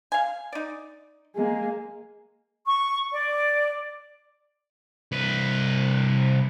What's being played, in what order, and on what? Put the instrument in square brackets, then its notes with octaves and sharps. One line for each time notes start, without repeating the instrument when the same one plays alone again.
[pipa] F5 G#5
D#4 D5
[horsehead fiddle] G#3 A#3
[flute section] C#6
D5
[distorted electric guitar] C2 B4